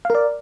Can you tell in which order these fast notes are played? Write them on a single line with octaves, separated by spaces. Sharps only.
F5 A#4 D5